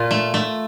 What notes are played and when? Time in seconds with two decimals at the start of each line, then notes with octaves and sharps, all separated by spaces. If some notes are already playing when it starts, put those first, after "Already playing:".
Already playing: A#2 F4
0.11 A3
0.34 A3